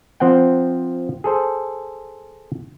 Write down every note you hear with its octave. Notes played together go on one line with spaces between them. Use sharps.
F3 C4 F#5 G5
G#4 A4 C5